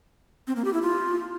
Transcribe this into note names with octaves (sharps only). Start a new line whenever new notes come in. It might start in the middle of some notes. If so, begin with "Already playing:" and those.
C4
A#3
G4
E4
F4